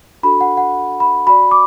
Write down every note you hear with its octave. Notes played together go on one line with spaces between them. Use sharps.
D4 F#4 A4 B5
F#5
F#5
B5
F#4 D5 B5
D6